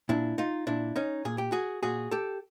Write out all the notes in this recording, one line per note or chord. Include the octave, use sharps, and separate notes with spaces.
A#2 D4 E4
D#4 F4
A#2 D4 E4
C#4 D#4
A#2 G#4
G4
F#4 G#4
A#2 F#4 G#4
G4 A4